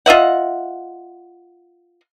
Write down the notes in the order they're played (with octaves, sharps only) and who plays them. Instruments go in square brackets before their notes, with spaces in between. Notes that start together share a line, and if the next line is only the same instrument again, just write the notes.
[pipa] F4 D#5 E5 F#5